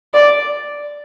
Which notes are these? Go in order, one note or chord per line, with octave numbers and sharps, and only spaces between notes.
D5